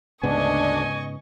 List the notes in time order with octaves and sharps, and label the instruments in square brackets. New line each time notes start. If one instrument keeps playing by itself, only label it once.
[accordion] D2 D4 [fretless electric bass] G#2 C#3 B3 [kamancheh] D#5 C#6 [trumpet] G#5